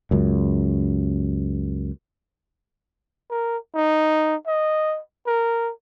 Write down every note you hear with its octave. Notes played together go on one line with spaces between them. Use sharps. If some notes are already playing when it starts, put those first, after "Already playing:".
C#2 F#2
A#4
D#4
D#5
A#4